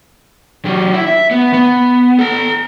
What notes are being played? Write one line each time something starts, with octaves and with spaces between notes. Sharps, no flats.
F#3 G4
E4
E5
B3
B3
A4 A#5